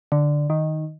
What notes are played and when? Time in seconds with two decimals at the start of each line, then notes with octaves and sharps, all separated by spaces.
0.12 D3
0.50 D#3